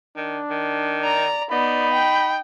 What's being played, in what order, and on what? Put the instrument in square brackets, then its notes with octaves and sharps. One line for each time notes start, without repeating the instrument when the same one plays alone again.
[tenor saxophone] D#3 [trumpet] D4
[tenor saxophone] D#3
[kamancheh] D5 A#5
[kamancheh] B3 D5 [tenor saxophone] D#4 [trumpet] B5
[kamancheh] G5